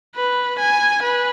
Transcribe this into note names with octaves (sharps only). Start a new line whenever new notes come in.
B4
G#5
B4